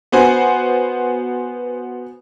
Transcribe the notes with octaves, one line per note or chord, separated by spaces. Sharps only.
B3 F#4 C5 G#5